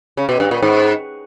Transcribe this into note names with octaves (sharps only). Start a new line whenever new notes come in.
C#3
B2
G2
A#2
G#2